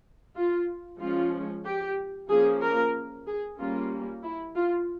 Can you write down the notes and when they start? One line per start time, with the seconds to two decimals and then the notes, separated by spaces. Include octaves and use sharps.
0.36 F4
1.00 F3 G#3 C#4 F4
1.65 G4
2.29 F3 A#3 C#4 G#4
2.61 A#4
3.27 G#4
3.59 G3 A#3 C#4 F4
4.23 E4
4.56 F4